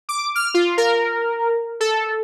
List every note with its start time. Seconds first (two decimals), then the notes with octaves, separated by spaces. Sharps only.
0.09 D6
0.35 F6
0.54 F4
0.78 A#4
1.80 A4